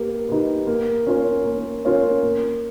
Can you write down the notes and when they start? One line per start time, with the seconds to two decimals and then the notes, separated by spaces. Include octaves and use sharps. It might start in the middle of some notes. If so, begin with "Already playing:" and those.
Already playing: A#3 G4 B4
0.29 D#4 G4 B4
0.67 A#3
1.07 C#4 F4 A#4 C#5
1.45 A#3
1.85 C#4 F4 A#4 C#5
2.23 A#3